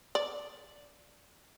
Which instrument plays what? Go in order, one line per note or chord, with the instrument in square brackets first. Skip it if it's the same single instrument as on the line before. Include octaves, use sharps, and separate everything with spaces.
[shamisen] D5